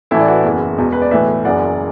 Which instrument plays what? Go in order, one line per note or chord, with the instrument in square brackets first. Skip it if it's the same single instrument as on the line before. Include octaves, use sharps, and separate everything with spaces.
[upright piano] A1 A2 E3 E4 A4
D5
F#4 B4
F#1 E2 E3
E1 E2 B2
B4
D5
B1 A2 E3 B4 E5
F#1 F#2 E3 D5 F#5